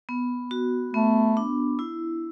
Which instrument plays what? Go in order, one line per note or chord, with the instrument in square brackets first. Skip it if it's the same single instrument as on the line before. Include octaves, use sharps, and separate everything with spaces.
[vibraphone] B3
F#4
[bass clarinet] A3 [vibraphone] B3
[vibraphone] D4
E4